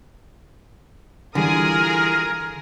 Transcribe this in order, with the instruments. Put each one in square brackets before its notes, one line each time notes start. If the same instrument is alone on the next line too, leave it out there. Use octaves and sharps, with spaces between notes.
[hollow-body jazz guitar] D3 [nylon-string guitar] E3 G3 [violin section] F4 G#4 D#6 [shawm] A#4